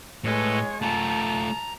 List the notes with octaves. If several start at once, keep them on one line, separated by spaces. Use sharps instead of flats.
A2 G#3 A4 B4 C#5 D#5
A3 F4 A5 A#5